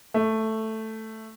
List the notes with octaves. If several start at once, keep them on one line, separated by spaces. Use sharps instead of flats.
A3